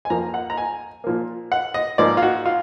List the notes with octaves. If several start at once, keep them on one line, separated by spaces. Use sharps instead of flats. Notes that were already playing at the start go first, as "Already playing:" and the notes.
G#5
F2 F3 A#3 A#5
F#5
A#5
G#5
A#2 F3 A#3
F#5
D#5
G#2 F3 A#3 D5
F4
F#4
F4